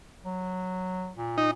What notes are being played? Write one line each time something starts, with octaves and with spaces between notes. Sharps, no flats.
F#3
A#2
D#4